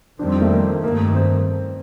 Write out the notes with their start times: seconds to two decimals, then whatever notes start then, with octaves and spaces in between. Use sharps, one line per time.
0.19 F2 D#3 G3 C4 D4
0.42 A3
0.51 A#3
0.83 G2 D#3 A3 A#3
1.15 C4